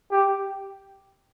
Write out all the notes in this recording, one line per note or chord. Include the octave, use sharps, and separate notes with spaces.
G4